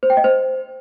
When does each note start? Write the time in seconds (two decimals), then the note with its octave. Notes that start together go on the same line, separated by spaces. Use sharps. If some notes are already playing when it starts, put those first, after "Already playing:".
0.03 C5
0.10 G5
0.17 D#5
0.24 C5